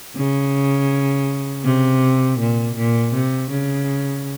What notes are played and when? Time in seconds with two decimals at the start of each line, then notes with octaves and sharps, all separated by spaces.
0.16 C#3
1.64 C3
2.39 A#2
2.76 A#2
3.13 C3
3.50 C#3